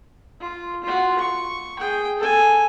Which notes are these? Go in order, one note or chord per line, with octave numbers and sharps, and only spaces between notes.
F4
F4 F#4
C#6
G#4 G5
A4 G#5